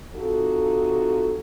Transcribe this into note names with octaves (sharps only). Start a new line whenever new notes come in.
C3 D#4 F4 F#4 A4